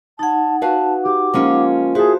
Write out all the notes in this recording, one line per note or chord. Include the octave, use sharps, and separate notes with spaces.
D#4 F#5 A5 G#6 A6
F#4 B4 F5 A5
G4 D6
F3 G#3 A#3 C#4 F4
E4 F#4 G#4 C5 A5